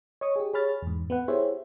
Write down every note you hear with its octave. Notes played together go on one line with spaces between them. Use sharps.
C#5 D#5 C#6 D#6
G4 G#4
G#4 C#5 B5 F6 A6
E2 G#2
B3 B4 F#5
E4 G4 G#4 C5 C#5 E5